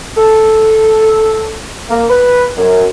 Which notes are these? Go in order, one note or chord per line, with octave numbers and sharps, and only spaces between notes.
A4
A#3
B4
F#2